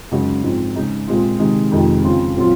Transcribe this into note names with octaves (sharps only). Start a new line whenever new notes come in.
F#2 C#3 G#3 D#4 F#4
G#2 F3 G#3 C4
C#3 G#3 D#4
A#2 G#3 C4 F4
C3 D#3 G#3 D#4
F2 C3 D#3 G#3
C#3 F3 C4 F4
A#2 F#3 C4 F4